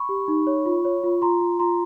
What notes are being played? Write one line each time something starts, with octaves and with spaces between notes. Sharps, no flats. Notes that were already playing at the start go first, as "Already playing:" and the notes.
Already playing: B5 C#6
G4
D#4
C#5
F4
C#5
F4
F4 A#5 C6
F4
F4 A#5 C6